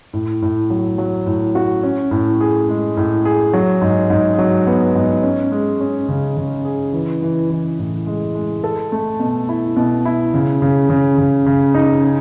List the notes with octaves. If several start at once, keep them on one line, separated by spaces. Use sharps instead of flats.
A2
A2
F#3
F#3
A2
F#4
C#4
A2
G#4
G#3
A2
G#4
F#3
G#2
G#2
F#3
B3
G#2
C#4
G#3
C#4
C#3
C#3
G#4
E3
E3
E3
A2
G#3
G#3
A4
A3
B2
E4
B2
E4
C#3
C#3
C#3
C#3
C#3
D#4
G#4